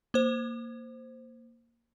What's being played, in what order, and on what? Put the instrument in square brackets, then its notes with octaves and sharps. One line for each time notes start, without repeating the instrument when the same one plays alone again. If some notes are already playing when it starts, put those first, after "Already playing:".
[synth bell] A#3 C5